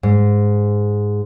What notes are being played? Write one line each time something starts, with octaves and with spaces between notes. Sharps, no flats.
G#2